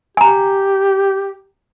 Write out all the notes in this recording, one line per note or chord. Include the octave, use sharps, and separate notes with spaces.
G4 G#5 A#5